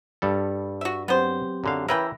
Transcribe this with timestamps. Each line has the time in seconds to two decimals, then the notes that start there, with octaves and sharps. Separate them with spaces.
0.22 G2 G3 A4
0.81 F#4 E5
1.08 F#3 B3 C4 G4 C5
1.64 F#2 D3 F5
1.88 C#3 E3 A#4 B4 E5 G5 E6 A#6